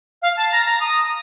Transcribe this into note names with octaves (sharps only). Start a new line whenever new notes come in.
F5
A5
A#5
A#5
D#6